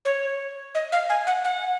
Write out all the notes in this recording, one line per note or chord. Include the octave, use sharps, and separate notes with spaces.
C#5
D#5
F5
G#5
F#5
F#5